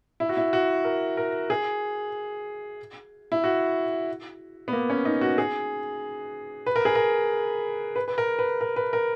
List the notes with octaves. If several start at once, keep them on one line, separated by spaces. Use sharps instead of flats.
E4
F#4
E4
F#4
A#4
A#4
G#4
E4
F#4
B3
A#3
C#4
D#4
F#4
G#4
B4
A#4
G#4
A#4
B4
B4
A#4
B4
A#4
B4
A#4